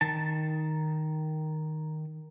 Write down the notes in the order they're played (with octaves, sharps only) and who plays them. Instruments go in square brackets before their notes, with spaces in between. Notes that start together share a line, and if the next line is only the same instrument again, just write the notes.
[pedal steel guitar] D#3 A5